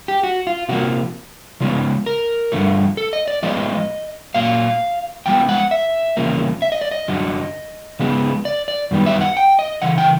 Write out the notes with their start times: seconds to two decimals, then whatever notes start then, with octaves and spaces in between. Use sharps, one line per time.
0.08 G4
0.23 F#4
0.47 F4
0.69 C3 F3 A#3 F#4
1.61 C#3 F3 G#3 B3
2.06 A#4
2.52 G2 D3 F3 A3
2.97 A4
3.13 D#5
3.28 D5
3.43 A2 F3 G#3 B3 D#5
4.34 A#2 F#3 A#3 F5
5.26 A2 F3 G#3 B3 G5
5.49 F#5
5.71 E5
6.17 E2 C#3 F3 A#3
6.62 E5
6.72 D#5
6.81 D5
6.91 D#5
7.08 F#2 D3 F#3
7.99 C#3 F3 G#3 B3
8.45 D5
8.68 D5
8.91 F#2 D#3 G3 B3
9.06 E5
9.21 F#5
9.37 G5
9.59 D#5
9.82 C#3 E3 F#5
9.98 G5